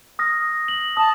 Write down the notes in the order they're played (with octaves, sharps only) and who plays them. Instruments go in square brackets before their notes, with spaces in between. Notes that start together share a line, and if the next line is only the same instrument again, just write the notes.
[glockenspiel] D#6 F6 A#6
F#7
[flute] A5 [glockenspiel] D#6